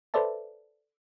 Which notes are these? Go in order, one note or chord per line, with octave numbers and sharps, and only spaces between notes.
A4 B4 C5 D5 E5 A5